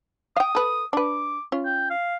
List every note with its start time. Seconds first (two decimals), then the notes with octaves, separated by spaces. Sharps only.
0.36 F5 G5 D#6
0.55 A4 B4
0.93 D4 B4 D6
1.52 C#4 F4
1.65 G5
1.90 F5